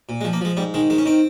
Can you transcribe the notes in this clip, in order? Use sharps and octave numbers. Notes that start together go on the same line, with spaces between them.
A#2
G#3
F3
A#3
F3 G#3
G#2 G3
D#3 G#3
D#3 G#3
C#4
D#3 C4